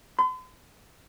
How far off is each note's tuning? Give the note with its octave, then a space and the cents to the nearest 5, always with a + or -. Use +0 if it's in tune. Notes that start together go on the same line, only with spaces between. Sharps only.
C6 -45